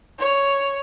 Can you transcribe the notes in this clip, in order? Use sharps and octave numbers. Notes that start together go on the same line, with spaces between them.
C#5